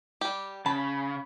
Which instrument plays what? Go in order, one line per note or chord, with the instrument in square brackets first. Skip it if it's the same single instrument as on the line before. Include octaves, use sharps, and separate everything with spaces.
[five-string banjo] G3 G4
[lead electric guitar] C#3 [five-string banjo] A5 [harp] B5